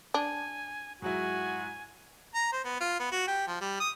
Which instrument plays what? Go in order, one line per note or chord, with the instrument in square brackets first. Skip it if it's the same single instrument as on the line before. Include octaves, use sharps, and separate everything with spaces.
[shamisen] D4 [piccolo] G#5
[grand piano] G#2 F#3 E4 [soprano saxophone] F#4 [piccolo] G#5
[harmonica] A#5
C5
B3
F4
B3
F#4
G4
F3
G3
D#6